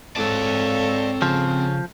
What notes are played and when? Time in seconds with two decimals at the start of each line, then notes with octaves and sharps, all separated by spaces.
0.16 G#2 C4 A4 C#5 D5 F5 A5
1.22 C#3 F3